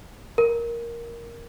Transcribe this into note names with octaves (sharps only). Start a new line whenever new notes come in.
A#4